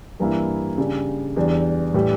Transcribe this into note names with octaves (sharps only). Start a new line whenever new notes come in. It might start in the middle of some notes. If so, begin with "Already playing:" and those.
G2 E3 A#3 E4
C#3 G3 D4
E2 E3 G3 D4
A2 E3 G3 D4